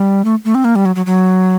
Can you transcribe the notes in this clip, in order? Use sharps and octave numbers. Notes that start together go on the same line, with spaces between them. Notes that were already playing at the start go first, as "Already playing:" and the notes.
Already playing: G3
A3
A3
C4
A#3
G3
F#3
F#3
F#3